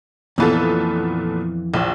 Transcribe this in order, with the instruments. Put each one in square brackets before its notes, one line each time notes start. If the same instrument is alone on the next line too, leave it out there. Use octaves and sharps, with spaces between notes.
[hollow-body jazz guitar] F2 E3 [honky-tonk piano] A#2 B3 A4
[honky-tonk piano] A#1